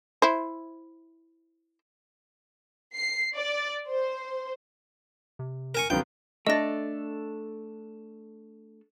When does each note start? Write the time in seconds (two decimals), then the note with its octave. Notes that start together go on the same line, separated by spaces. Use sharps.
0.22 E4 C5
2.94 C7
3.35 D5
3.89 C5
5.39 C3
5.75 A#4 G#5 C#6
5.90 C#2 G2 D3 F#3 B3 C4 F4 G5
6.47 A3 D4 A4 D#5 A#6